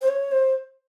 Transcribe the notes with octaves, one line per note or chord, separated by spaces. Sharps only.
C5
C#5
C5